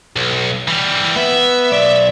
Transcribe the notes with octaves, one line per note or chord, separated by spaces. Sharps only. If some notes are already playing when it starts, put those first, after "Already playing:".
B1
E3 G3
B3 E5
B1 D5